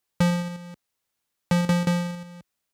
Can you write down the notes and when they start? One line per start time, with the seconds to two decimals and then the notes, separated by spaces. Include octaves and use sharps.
0.20 F3
1.51 F3
1.70 F3
1.87 F3